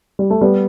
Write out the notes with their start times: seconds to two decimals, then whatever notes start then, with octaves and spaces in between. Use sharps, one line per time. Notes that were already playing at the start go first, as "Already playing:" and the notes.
0.19 G3
0.30 A3
0.41 G3 B3